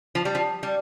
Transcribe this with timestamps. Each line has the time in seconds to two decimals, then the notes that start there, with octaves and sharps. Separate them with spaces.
0.15 F3
0.25 G3
0.35 F3
0.63 G3